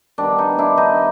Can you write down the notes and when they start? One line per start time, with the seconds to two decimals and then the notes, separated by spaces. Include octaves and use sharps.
0.18 D#3 G3 B3 D4
0.39 D#4
0.58 D4 E4
0.78 D#4